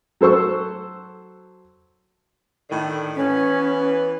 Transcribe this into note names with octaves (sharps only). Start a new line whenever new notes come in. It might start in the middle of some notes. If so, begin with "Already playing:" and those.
F#3 A4 C5 C#6 E6
A2 D3 D#3
E3 B3 C#4 B4